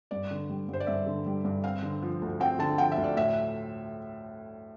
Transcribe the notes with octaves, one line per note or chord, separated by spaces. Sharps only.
G2 D5
D3
G3
G2
C5
D5
G2 E5
D3
G3
G2
C4 F5
D3
F3
D2
C4 G5
D3 A5
F3 G5
E5
D2
D5
A2 E5